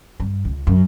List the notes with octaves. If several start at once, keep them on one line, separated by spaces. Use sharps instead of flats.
G2
C#2
F#2